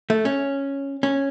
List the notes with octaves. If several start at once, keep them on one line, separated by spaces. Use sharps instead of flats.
A3
C#4
C#4